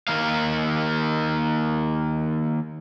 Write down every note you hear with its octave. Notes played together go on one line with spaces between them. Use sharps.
D#3 A#3 F5